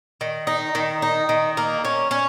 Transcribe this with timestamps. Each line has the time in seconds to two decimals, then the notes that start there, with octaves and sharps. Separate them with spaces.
0.21 D#3
0.47 D#4
0.75 D#3
1.02 D#4
1.29 D#3
1.57 A#3
1.85 C#4
2.11 C#4